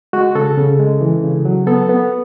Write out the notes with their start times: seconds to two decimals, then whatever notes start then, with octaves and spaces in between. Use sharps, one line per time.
0.13 G#3 F#4
0.35 C#3 A4
0.58 C#3
0.79 G#3
1.01 E3
1.24 C#3
1.45 F#3
1.67 B3 A4
1.89 B3